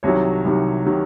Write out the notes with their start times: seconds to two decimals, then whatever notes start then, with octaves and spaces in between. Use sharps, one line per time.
0.03 C2 C3 D#3 F#3 C#5
0.45 C2 C3 D#3 F#3
0.86 C3 D#3 F#3